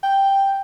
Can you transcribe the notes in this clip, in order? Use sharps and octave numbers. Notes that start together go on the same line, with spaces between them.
G5